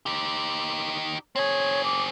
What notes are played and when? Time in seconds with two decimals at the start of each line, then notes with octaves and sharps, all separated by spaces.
0.06 D#4 G4
1.36 C4 G#4 C#5
1.84 D6